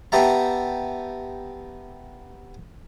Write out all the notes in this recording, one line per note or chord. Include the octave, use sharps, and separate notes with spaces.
B3 G4 E5 A5 A#5